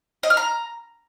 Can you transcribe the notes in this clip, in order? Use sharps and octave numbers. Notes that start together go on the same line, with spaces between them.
D#5
F6
A#5